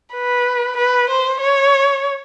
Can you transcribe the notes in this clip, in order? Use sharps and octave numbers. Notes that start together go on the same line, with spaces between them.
B4
B4
C5
C#5